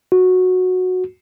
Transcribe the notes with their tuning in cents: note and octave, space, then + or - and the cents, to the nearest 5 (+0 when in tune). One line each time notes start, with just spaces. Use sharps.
F#4 -10